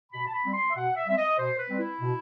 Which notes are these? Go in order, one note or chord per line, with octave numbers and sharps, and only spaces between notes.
B2 B5
A5
B5
G3 C4
C6
E5
B2 F#5
E5
G3 C4 E5
D#5
B2 C5
B4
G3 C4
E4
B2